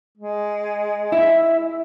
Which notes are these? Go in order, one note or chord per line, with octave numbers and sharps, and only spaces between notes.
G#3
E4 E5